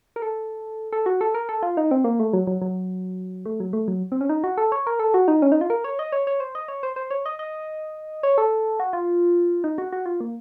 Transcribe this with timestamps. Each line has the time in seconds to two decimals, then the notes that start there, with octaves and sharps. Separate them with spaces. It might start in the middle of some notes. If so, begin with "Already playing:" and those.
0.16 A#4
0.22 A4
0.92 A4
1.06 F#4
1.21 A4
1.35 A#4
1.49 A4
1.63 F4
1.77 D#4
1.91 C4
2.04 A#3
2.20 A3
2.33 F#3
2.47 F#3
2.61 F#3
3.46 A3
3.60 F#3
3.73 A3
3.88 F#3
4.12 C4
4.21 C#4
4.29 D#4
4.44 F#4
4.58 A4
4.72 C#5
4.87 A#4
5.00 A4
5.14 F#4
5.28 D#4
5.42 C#4
5.52 D#4
5.61 F4
5.70 A#4
5.84 C#5
5.99 D#5
6.12 C#5
6.27 C#5
6.40 C5
6.55 D#5
6.68 C#5
6.83 C5
6.96 C5
7.11 C#5
7.26 D#5
7.39 D#5
8.23 C#5
8.38 A4
8.80 F#4
8.93 F4
9.64 D#4
9.78 F#4
9.92 F#4
10.06 F4
10.20 A#3